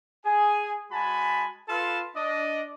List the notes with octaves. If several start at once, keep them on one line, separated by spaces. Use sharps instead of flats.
G#4 G#5
G#3 F#4 G#5 A5 B5
F4 A4 B4 F5 A5 C6
D4 D5 D#5